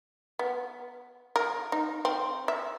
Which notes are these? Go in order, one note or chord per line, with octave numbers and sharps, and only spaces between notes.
B3
A#4
D#4
C4
E5